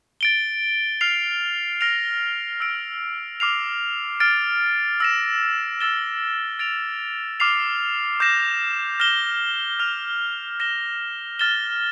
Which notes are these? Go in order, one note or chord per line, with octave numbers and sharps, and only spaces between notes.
A6 D7 G7
F6 C7 F7
F6 A#6 D7 F7
E6 A#6 D7
D6 F6 C7 F7
F6 A6 D7
E6 A#6 E7
E6 A6 E7 G7
A6 D7 F7
D6 F6 C7 F7
D6 G6 A#6 E7
F6 A#6 E7 G7
F6 A#6 F7
F6 A#6 E7 G7
F6 A6 E7 G7